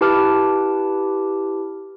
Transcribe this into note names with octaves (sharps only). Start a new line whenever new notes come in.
E4 G4 B4 A5 D6 F6